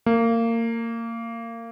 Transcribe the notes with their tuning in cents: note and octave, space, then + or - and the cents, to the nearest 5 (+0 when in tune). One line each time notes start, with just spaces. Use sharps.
A#3 -25